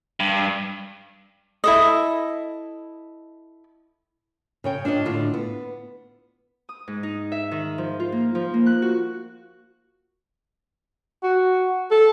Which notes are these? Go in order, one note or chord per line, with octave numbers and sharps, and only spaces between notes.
G2
E4 A4 D#5
C#3 C#5 G5
D4 F4 C#5 D#5
A2 D3 D4 F4
B3
D#6
G#2
D#4
E5
D#3
F3
F4
A#3
F3
A#3
F#6
F#4
F#4
A4